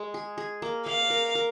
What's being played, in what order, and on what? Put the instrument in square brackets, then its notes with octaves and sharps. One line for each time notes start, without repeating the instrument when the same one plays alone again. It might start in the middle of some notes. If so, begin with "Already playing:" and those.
Already playing: [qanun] G#3
G#4
G#4
A#3
[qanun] A#3 [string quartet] F5
[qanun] A#4
A#4